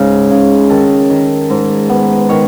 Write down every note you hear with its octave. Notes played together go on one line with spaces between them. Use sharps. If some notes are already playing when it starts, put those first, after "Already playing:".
Already playing: G#2 C#3 G#4
C#3
D#3 A4
D#3
G#2
B3
D#3 C#5